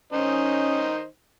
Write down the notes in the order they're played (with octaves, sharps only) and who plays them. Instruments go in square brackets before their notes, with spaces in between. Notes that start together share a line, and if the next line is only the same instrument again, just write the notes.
[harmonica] D#3 D#4 C5 [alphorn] C#4